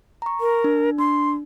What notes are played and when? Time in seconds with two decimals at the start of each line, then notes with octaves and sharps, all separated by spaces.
0.22 A#5 C#6
0.41 A#4
0.64 D4
0.98 D4 C6